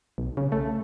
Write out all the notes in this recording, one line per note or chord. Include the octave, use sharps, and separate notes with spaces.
B1
C#3
A3